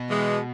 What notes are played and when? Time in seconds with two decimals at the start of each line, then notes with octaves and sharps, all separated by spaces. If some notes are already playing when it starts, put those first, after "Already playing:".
Already playing: B2
0.09 E3 G#3